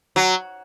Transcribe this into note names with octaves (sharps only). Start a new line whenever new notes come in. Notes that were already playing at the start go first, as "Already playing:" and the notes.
F#3